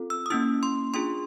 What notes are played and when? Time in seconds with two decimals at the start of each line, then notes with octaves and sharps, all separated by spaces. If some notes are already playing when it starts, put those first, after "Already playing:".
Already playing: C4 F4 A4
0.10 E6
0.26 D#6
0.30 A#3 C#4 E4 E6
0.63 C6
0.94 D4 F4 G#4 C6